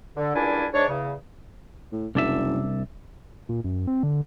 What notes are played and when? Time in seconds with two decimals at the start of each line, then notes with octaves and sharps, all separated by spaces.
0.17 D3
0.35 C#2 A#2 G3 D4 E4 G#5
0.73 G#2 D4 C#5
0.89 E2 C#3
1.92 A2
2.15 F#1 C2 D4 E5
3.49 A#2
3.64 F#2
3.87 C4
4.03 D3